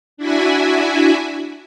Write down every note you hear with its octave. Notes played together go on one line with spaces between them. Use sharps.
D4 E4 F#4 E5 G#5